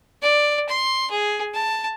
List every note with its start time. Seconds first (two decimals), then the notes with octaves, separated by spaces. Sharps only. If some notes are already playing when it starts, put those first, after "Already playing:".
0.22 D5
0.69 C6
1.10 G#4
1.54 A5